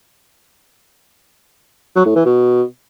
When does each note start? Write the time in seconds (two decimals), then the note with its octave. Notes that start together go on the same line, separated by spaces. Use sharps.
1.96 F#3
2.06 A2
2.15 E3
2.25 B2